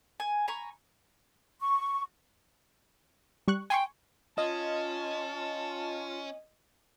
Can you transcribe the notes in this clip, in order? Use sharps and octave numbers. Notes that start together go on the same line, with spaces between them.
G#5
G#5 A#5 B5 C#6
C#6
G3 C#6 F#6
G5 G#5 C6 C#6
C#4 F4 D#5 A5